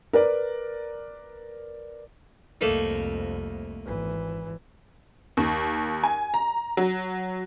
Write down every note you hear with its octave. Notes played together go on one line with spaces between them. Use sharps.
A#4 B4 D5
C2 F2 A3 A#3 D#4
G#1 E3
D#2
G#5
A#5
F#3